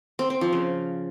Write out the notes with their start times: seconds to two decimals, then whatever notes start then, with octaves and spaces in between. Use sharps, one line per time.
0.19 C4
0.30 C4
0.41 F3
0.53 C#3